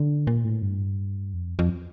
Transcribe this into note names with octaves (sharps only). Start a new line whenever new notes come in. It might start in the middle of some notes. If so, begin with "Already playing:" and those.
Already playing: D3
A#2
A2
G2
F2
F2